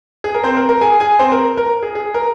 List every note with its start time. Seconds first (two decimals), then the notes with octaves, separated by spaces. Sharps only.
0.24 G#4
0.34 A#4
0.43 C4 C5
0.57 A#4
0.69 A#4
0.81 G#4 G#5
1.00 G#4 G#5
1.19 C4 C5
1.32 A#4
1.57 A#4
1.83 G#4
1.95 G#4
2.14 A#4